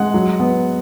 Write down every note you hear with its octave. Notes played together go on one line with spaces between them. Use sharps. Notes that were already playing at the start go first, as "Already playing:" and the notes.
Already playing: G#3 F#5
F#3
B3